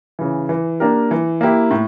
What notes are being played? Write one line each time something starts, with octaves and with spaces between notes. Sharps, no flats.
C#3 E3
E3
A#3 D4 G4 A#4
E3
A#3 E4 G4
A2